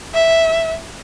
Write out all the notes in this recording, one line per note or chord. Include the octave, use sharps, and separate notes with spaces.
E5